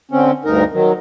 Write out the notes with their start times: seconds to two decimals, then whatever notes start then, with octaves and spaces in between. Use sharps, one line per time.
0.11 D3 C4 C#4
0.45 D2 G2 D#4 A#4
0.73 D#3 F#3